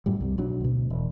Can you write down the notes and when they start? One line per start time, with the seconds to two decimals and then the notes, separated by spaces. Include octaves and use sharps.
0.06 F#2 A2 G3
0.21 C2 C3 G3
0.38 B1 F#3 D4
0.61 D2 B2
0.90 E1